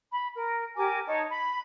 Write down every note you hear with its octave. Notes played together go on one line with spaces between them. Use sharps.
B5
A#4
G4 A#4 G#5 D6
D#4 C#5 A5
B5